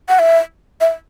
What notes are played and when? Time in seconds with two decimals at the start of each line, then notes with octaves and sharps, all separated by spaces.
0.09 F#5
0.19 E5
0.81 E5